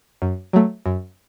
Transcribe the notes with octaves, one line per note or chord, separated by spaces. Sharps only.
F#2
F#3 A3
F#2